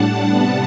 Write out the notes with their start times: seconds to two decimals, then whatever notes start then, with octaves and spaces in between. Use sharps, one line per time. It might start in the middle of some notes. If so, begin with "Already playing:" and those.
Already playing: A2 G3 D4 F#5 A5
0.28 C3 G3 B3